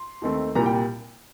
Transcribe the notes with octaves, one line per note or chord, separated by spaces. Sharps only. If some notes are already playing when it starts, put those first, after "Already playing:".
Already playing: C6
D#2 D#3 A3 C4
C2 A#2 G3 A#3 A#5
G5